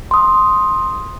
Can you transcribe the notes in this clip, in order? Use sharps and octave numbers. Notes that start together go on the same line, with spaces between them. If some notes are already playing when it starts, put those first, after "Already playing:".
C6 D#6